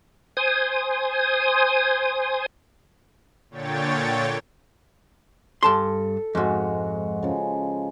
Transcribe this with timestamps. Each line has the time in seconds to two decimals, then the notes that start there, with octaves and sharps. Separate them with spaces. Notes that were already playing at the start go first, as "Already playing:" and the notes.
0.37 C5 G#5 D#6
3.50 A#2 D3 C#5 G5 A6
5.63 G2 A4 A5 C6
6.35 F2 G#2 G#3 F#4
7.23 C#3 F3